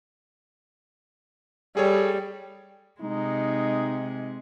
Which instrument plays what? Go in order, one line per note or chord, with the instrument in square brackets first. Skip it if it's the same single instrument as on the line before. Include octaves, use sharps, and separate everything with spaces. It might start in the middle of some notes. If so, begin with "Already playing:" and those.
[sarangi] G3 [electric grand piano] G#4 A4 C#5
[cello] C3 G#3 [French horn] D#4